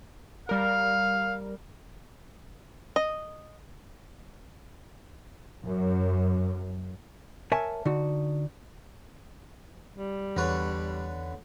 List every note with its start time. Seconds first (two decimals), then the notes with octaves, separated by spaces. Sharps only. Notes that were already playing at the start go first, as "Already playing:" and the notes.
0.49 G3 A#4 F5
2.96 D#5
5.64 F#2
7.52 A#4 C#5 E5 G#5 A5
7.85 D3 D#4 F#4
9.95 G3
10.37 E2 D3 B4 C#5